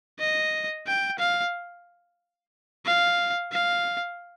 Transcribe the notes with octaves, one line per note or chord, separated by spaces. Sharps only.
D#5
G5
F5
F5
F5